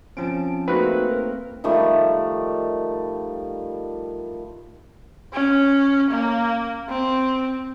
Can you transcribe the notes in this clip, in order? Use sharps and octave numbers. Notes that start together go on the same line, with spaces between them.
F3 C4 C#4 A5 D7
A3 A#3 C4 D#4 F#4 G#4 B4 F#6
A#4
D#3 F3 G3 A3
C#4
A#3
C4